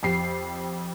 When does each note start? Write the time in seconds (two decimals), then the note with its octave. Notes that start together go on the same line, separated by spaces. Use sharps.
0.03 F2 G4 C7